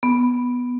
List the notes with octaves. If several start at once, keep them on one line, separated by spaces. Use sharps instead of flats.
B3